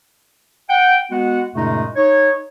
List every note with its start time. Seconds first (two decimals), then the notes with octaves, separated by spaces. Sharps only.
0.69 F#5 G5
1.11 G#3 B3 F#4 F#5
1.54 F#2 A#2 C#3 G#3 A3 D#4
1.96 D#4 C#5